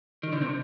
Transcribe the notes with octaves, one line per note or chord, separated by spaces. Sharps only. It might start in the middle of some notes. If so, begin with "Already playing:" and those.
D#3
D3
C3